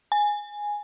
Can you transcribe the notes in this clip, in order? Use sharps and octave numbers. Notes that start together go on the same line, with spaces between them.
G#5